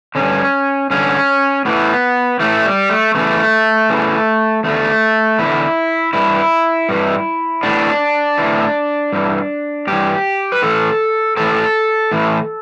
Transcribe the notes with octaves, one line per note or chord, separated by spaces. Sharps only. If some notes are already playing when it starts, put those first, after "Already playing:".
G2 D3 C#4
G2 D3 C#4
A2 E3 B3
A2 E3 A3
G3
A3
E2 C#3 E3 A3
E2 C#3 E3
E2 D3 A3
E2 D3 E4
G2 E3 E4
G2 E3
A2 E3 D4
E3
A2
G2 E3
G2 E3 G4
B4
A2 E3 A4
A2 E3 A4
A2 E3